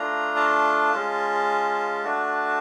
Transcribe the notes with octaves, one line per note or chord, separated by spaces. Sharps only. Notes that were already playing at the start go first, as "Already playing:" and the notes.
Already playing: A3 D4 F4 A#5
A5
G#3 C#4 F4
A3 D4 F#4